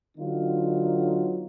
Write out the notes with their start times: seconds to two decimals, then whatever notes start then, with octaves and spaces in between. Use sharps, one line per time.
0.18 D3 F#3 B3 D#4 F4